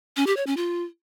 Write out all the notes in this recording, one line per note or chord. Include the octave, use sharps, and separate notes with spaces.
C#4
G4
C#5
C#4
F4